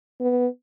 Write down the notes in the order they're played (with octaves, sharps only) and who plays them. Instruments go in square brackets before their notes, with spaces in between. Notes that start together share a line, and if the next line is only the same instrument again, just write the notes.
[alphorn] B3